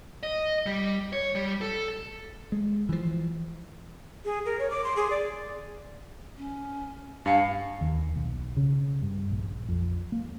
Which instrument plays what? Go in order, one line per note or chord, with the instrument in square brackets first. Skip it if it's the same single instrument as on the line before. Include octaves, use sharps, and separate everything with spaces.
[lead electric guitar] D#5
G3
C#5
G3
A4
[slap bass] G#3
E3 F3
[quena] G#4
A#4
C#5
D6
C6
G#4
D5
[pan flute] C#4
[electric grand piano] G2 G#5 C#7 [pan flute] F5
[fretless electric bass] D#2
B1
C#3
G2
A#1
F2
A#3